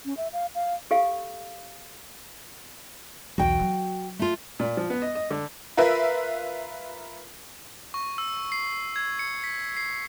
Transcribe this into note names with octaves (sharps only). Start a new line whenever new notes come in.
C#4
E5
F5
F5
G4 A4 F5
B1 E2 F#4 G5
F#3
A3 F4
A#2
F3
B3
D#5
D#5
D3
F4 A#4 B4 E5
C#6
E6
C7
G#6
C#7
B6
C7